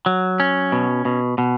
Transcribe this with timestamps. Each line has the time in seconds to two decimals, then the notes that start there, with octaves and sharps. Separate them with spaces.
0.06 F#3
0.40 C#4
0.72 B2
1.05 B2
1.38 B2